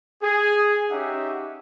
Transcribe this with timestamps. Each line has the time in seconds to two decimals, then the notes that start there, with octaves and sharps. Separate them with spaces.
0.23 G#4
0.90 C#4 D#4 G4 E5 F#5